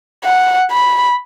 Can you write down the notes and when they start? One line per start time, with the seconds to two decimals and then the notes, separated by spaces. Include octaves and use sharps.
0.25 F#5
0.71 B5